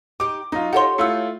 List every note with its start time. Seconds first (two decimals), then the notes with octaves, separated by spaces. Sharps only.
0.20 D#4 G4 D6
0.52 F#3 D#4 F4
0.73 G4 A4 C#5 F#5 C6
0.98 A3 E4 F4 E6 C#7